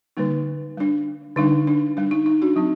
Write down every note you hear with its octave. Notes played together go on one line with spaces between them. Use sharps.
D3 G3 A#3 D#4
G3 D4
D3 G3 D4 D#4
D4
G3 D4
D#4
D#4
D4 F#4
F#3 C4 D#4